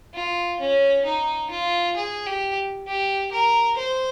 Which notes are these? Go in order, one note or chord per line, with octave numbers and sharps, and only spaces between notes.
F4
C#4
D#4
F4
G#4
G4
G4
A#4
C5